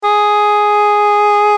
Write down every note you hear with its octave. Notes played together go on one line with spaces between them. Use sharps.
G#4